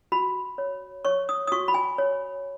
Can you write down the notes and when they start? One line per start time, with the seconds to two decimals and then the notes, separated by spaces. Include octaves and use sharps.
0.12 F#4 B5
0.58 C#5
1.05 C#5 C#6
1.29 D#6
1.47 D#6
1.52 F#4 C#6
1.68 B5
1.74 G#5
1.98 C#5